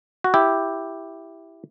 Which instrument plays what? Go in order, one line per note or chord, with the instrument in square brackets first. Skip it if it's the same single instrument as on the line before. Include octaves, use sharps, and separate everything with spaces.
[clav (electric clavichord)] F#4
E4 G4